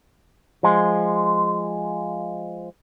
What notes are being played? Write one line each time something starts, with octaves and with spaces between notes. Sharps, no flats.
F3 G#3